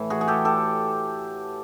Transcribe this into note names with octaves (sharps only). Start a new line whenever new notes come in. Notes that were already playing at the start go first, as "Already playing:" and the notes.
Already playing: A2 E3
F#4 G#4
G#4
G4 A4
G4 A4